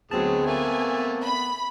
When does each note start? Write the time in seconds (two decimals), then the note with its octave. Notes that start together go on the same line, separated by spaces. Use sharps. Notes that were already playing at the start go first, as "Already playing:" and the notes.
0.11 D2 F#3 G#3 B3 C4 G#4 A5
0.47 A3 A#3 G#5
1.24 B5